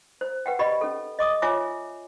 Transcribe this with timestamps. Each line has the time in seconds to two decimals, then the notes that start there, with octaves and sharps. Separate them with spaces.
0.21 C5
0.46 B4 F#5 G5
0.59 G4 D5 D#5 B5
0.81 C#4 A4
1.19 D#5 D6 D#6
1.42 F4 C#5 E5 G#5 D6